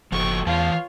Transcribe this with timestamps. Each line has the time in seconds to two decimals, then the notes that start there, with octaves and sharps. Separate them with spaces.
0.12 F#1 F3 F#4 A4 G5 C#6
0.47 E2 E3 F4 C#5 F5 A5